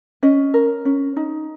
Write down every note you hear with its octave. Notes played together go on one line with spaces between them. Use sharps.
C#4 D#5
A#4
C#4
D#4